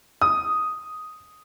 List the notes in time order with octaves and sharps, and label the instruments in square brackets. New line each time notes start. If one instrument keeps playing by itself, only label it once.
[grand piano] D#6